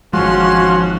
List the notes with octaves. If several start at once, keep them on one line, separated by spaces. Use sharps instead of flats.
G#1 F3 G#3 C#4 F#4 C6